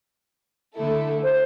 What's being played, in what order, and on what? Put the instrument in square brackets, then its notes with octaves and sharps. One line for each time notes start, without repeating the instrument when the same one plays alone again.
[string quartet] D3 A3 E4 A4
[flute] C5